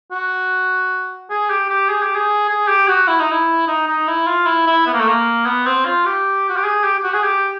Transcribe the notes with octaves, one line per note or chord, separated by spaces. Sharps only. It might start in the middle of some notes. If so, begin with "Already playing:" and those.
F#4
G#4
G4
G4
G#4
G4
G#4
G#4
G4
F#4
E4
D#4
E4
D#4
D#4
E4
F4
E4
E4
B3
A#3
A3
A#3
B3
C4
F4
G4
F#4
G4
G#4
G4
G4
F#4
G#4
G4